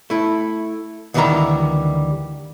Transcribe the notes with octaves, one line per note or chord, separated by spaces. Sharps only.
A3 E4
D2 D#3 E3 G3 E5 A#5